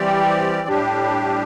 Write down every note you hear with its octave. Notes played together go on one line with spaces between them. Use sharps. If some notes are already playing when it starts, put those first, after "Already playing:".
Already playing: E3 G3 C4 G4 D5
A2 G3 D4 G4